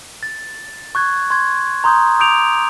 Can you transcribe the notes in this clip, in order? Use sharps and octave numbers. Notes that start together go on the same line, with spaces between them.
A6
C#6 F#6 G#6
C6 G#6
A#5 C6 D#6 G6
D6 D#6 G6 D7 F7